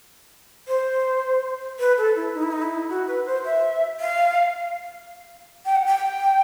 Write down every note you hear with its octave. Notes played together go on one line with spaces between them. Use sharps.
C5
B4
A4
E4
D#4
E4
D#4
E4
F#4
B4
C5
E5
F5
G5
F#5
G5